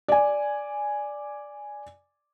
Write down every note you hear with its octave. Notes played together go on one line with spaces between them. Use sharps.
D5 G#5